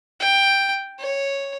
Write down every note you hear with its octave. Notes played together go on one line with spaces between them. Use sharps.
G5
C#5